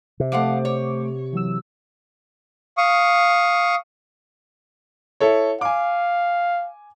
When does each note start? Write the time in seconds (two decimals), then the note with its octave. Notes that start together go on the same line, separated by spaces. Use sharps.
0.20 C3
0.32 F3 A3 C5 F5 F#5 D6
0.65 C#5
1.33 E3 F#3 E6
2.78 F5 C#6 D#6
5.20 E4 A4 C#5
5.61 F5 G#5 D6